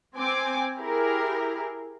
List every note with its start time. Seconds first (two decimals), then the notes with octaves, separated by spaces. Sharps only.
0.17 C4 G5 G#5 D6
0.78 E4 G4 G#4 A#4